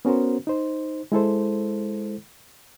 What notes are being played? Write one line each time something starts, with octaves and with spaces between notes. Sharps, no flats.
B3 C#4 F#4 A#4 C5
D#4 C5
G#3 E4 A4 C5